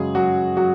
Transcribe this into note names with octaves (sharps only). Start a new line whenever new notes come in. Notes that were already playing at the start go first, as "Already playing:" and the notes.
Already playing: F#2 C#3 F#3 G#3 G#4
F#3 F#4
F#3 F#4